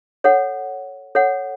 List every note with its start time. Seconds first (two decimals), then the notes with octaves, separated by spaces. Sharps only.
0.24 A4 C#5 F#5
1.15 A4 C#5 F#5